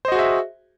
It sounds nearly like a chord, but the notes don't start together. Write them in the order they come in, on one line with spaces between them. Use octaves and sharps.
C5 D#5 F#4 G#4 E5